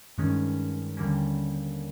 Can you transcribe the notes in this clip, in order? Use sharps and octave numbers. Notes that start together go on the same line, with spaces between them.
G2 D#3 G#3 C#4
D#2 D3 G3 A#3 C#4